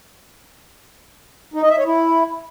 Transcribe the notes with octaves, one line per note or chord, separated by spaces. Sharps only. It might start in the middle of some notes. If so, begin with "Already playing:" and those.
D#4
D#5
E5
C#5
E4